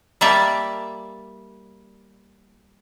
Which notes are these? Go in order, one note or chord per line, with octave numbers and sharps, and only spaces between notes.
G3 A#3 D5 E5 A5